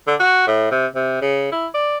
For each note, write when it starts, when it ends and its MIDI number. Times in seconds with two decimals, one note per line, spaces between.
0.07 0.15 50
0.20 0.46 66
0.47 0.69 45
0.71 0.86 48
0.95 1.18 48
1.22 1.48 49
1.52 1.67 64
1.74 1.98 74